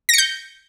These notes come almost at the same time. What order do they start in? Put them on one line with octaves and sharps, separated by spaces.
A#6 C#7 G6